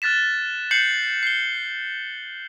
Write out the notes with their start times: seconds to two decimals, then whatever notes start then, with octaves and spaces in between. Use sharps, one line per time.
0.02 F6 F#6 A6 B6 E7
0.71 G6 C7 C#7 F#7
1.23 C7 G7